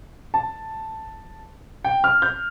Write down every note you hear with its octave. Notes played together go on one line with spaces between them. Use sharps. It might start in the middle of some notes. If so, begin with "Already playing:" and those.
A5
G5
F6
G6